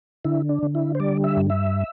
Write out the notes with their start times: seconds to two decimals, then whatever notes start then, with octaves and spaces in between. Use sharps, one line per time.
0.25 D3 E4
0.49 D4
0.63 D3
0.75 E4
0.95 C5
1.00 G3 D5
1.24 E5
1.37 G2
1.50 E5